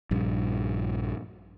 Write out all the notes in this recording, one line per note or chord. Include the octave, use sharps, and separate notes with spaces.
A#1 G2